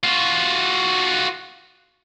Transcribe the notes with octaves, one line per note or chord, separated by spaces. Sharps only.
F4 F#4